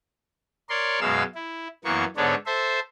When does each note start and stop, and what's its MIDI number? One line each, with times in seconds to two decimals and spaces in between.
0.69 0.99 70
0.69 0.99 73
0.69 0.99 74
0.69 0.99 84
1.01 1.23 42
1.01 1.23 47
1.01 1.23 56
1.01 1.23 77
1.01 1.23 88
1.35 1.68 64
1.85 2.05 42
1.85 2.05 52
1.85 2.05 58
1.85 2.05 59
1.85 2.05 85
2.17 2.35 44
2.17 2.35 50
2.17 2.35 59
2.17 2.35 62
2.17 2.35 69
2.17 2.35 73
2.46 2.80 69
2.46 2.80 72
2.46 2.80 76